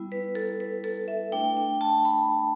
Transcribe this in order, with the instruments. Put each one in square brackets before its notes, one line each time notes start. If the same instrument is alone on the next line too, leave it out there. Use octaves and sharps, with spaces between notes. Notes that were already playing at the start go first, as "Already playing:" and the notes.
Already playing: [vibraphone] G3 B3 E4
B4
A4
B4
A4
E5
A3 D4 G5
G5
A5
B5